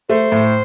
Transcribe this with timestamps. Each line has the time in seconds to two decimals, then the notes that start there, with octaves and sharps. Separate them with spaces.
0.09 A3 C5
0.32 A2